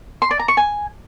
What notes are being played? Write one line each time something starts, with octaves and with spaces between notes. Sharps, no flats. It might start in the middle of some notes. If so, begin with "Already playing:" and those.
C6
D5
A#5
C#6
G#5